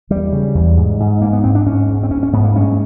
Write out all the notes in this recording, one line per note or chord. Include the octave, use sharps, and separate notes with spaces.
E2 G3
C#3
E2
G#2
G#2
G#2 A#3
B3
G#2 C4
D4
G#2 C#4
G#2
C4
G#2 C#4
C#4
G#2 B3
A#3
G2 C#4